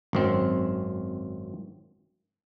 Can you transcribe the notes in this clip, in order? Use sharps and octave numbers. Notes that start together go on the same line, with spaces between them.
G#1 F#2 C4